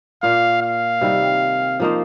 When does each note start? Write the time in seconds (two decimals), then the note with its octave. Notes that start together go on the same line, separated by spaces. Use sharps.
0.23 A#2 A#3 F4 F5
0.62 F5
1.01 C3 D#3 G3
1.80 F3 A#3 D#4 C5